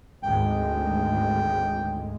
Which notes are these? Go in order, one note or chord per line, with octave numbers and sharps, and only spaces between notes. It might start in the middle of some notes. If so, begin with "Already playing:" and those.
G#1 D2 G#3 G5